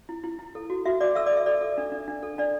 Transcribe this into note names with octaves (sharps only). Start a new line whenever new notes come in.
E4
E4
E4
A4
F#4
F#4 E5
F#4 D5 D6
A4 E5 E6
D5 D6
A4
E5
A4 D5
A4
D4
D4
D4
A4
D4 D5